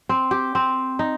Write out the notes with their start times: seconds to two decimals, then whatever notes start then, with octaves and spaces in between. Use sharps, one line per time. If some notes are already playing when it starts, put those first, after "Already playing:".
0.09 C4
0.31 G4
0.55 C4
0.99 D#4